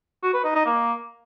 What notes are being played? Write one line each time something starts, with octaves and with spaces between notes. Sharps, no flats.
F#4
B4
D#4
D#4
A#3